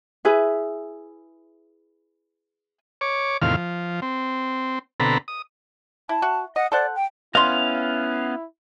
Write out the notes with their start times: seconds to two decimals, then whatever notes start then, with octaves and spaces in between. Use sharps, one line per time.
0.25 E4 G#4 B4 E5
3.01 C#5 D6
3.42 E2 A2 C3 D#3 F4 F5
3.57 F3
4.02 C4
5.00 B2 D3 C4 A4 A#5 B5
5.28 D#6
6.09 E4 A5
6.22 F#4
6.56 D#5 F#5
6.72 A4 C5 D5 F#5
6.96 G5
7.35 B3 C#4 E4 D#5 F5 C6